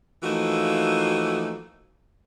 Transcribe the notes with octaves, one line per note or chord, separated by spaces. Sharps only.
E3 F3 A3 A#3 D#4 F#4